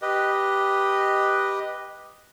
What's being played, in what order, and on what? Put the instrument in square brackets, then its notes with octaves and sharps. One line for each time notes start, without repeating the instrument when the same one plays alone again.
[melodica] G4 B4 D#5